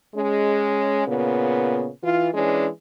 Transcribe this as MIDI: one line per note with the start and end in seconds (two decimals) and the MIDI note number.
0.15 1.02 56
0.15 1.02 61
1.06 1.88 46
1.06 1.88 49
1.06 1.88 59
2.03 2.28 52
2.03 2.28 65
2.34 2.67 52
2.34 2.67 56
2.34 2.67 61
2.34 2.67 62